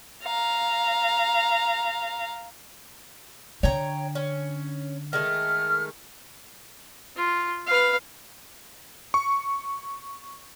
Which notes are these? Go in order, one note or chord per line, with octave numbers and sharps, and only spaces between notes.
F5 A#5
D3 C#5 G5 A#5
C#4
D#3 G#3 A3 F6
F4
B4 F5
C#6